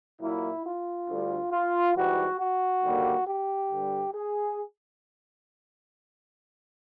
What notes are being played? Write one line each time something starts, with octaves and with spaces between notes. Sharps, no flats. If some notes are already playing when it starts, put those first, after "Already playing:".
A#2 F#3 A#3 E4
F4
D2 D3 G3
F4
G#2 E3 G3 F#4
F#4
D#2 D3 G3 A#3
G4
G2 D3 G3
G#4